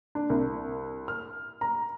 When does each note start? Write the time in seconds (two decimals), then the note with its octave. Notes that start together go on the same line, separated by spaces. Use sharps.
0.15 D4
0.30 C2
1.08 F6
1.61 A#5